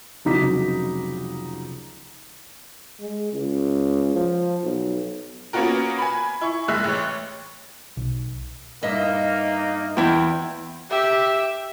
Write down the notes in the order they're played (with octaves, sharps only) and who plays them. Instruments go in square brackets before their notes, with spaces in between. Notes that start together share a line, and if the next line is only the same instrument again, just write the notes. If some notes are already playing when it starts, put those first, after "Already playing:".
[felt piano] F1 C#2 F#3 D#4 D6 B6
[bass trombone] G#3
C#2
F3
B1
[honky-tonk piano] A#3 B3 C#4 F4 F#4 A#4
G#5 B5
E4 C#6
F1 G#3 E5 F#6
A1 C#5
[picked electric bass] B1
[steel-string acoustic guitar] G2 D#5 E5 [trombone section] A#3 D#4
[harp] E2 [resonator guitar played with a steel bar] E4 G5
[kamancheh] G4 E5